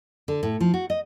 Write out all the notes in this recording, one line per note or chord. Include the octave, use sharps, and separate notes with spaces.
D3
A2
F3
F#4
D#5